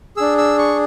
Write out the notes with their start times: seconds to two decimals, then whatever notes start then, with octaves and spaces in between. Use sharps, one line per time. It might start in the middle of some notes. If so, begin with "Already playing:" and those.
0.17 D4 G#4 E6
0.38 E6
0.59 C#6